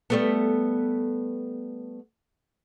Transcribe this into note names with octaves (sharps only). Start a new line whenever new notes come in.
G3 A3 B3